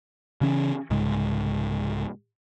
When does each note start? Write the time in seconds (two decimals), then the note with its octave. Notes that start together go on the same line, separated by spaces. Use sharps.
0.41 C#3 E3 C#4
0.90 C2 G#2 C#3 G#3